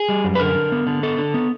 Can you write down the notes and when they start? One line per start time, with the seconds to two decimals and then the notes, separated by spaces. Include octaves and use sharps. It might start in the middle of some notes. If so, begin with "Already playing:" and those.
Already playing: G#4
0.09 G3
0.24 F#2
0.35 B4
0.39 D3 A#4
0.55 D3
0.72 B3
0.87 D3
1.03 B3 A4
1.18 D3
1.34 B3